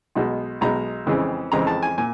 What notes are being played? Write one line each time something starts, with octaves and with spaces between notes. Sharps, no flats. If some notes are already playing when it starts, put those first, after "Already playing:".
B1 B2 G#3
B1 B2 G#3 A#5
F2 C#3 E3 G#3 C4
F2 C#3 E3 G#3 C4 A#5
A5
G#5
A#2 G#5